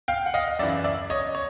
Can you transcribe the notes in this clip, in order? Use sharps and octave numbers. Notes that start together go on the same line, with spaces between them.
F5 G5
F#5
D#5 F5
F#2 C#3 E3 D5 E5
D5 E5
C#5 D#5
C#5